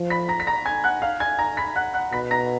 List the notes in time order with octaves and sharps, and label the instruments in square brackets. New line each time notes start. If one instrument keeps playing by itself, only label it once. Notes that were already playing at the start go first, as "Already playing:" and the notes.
Already playing: [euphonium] F3
[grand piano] B5 B6
A#5 A#6
B6
A#5 A#6
G#5 G#6
F#5 F#6
F5 F6
G#5 G#6
A#5 A#6
B5 B6
F#5 F#6
F#5 F#6
[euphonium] B2 [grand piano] B5 B6
[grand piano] A#5 A#6